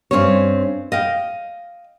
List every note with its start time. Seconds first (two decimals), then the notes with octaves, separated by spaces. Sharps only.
0.11 G2 C4 C#4 C5 C#5
0.92 D#5 F5 G5